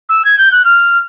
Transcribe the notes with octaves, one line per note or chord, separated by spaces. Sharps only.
E6
G#6
G6
F#6
F6